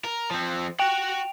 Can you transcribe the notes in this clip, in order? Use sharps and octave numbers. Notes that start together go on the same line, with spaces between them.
A#4
F3 C4
F#4 F#5 G5 D7 F7